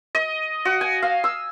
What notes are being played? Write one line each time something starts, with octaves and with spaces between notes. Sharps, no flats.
D#5
F#4
G#5
F5
E6